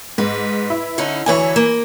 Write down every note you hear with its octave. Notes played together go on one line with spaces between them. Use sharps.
G#2 B4
E4
D3 C#4 D#4
D2 E3 E4 C#5 G#5
A#3